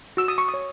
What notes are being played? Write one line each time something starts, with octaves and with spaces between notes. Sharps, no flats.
F#4 E6
D#6
C#6
D#6
C#5